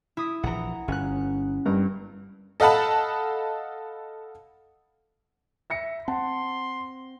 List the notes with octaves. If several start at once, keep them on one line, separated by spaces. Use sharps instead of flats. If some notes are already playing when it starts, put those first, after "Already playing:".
E4 D#6 B6
A#1 E3 F#5 A#5
G1 C#4 F#6
G2 A#4
A4 D#5 F5 F#5 A5 B5
E5 A#6 C#7
C4 F#5 A5 C6